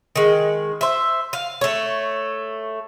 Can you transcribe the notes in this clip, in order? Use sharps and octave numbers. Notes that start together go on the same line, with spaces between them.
D#3 G#3
C5 E5
F5
A3 C#5